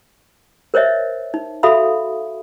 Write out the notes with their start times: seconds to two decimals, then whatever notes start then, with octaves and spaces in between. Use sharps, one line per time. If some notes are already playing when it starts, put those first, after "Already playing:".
0.74 A#4 C5 C#5 D#5 E5
1.34 D#4
1.63 F#4 A4 E5 F5 B5 D#6